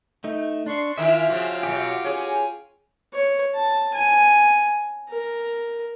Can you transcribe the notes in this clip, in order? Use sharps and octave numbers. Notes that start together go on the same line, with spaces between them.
A3 D#4
D4 C6 C#6
D#3 E4 F4 A#4 E5 G5
C#3 F3 F#4
B2 F#3 F#4 G4
C#4 G#4 C#5
C#5
A5
G#5
A#4